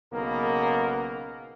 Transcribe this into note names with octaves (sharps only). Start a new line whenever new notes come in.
B1 C#3 A#3 B3 A#4